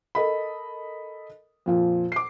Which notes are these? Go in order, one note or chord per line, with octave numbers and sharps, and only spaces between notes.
A4 A#4 D#5 B5
F2 A#2 F3
D6 C7